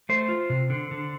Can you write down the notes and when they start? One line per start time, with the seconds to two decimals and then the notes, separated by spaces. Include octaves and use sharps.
0.09 A3 C5
0.29 F4
0.50 C3
0.70 D3
0.91 D3